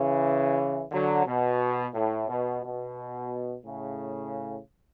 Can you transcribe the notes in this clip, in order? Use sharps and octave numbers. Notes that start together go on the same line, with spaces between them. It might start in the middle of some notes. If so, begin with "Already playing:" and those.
Already playing: C#3 E3
D3 F#3
B2
A2
B2
B2
A2 C#3